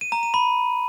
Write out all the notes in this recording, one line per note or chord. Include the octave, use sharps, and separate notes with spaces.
D#7
A#5
D#7
B5